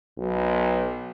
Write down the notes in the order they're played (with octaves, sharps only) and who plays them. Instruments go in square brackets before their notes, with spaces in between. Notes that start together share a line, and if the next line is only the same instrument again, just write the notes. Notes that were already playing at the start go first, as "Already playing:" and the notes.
[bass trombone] B1